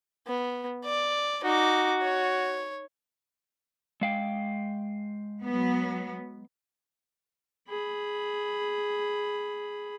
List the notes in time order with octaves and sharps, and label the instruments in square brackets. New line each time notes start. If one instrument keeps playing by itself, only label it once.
[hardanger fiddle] B3
D5
[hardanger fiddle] D#4 D6 [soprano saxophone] F#4
[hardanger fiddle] C#5
[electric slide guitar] G#3 F5 G5
[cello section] F#3 B3
[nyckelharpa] G#4 B5